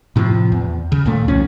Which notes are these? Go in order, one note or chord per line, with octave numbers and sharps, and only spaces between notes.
A2 C3 D#3 F3
E2
C#3
D#2 A#2 A3
C2 F3 C#4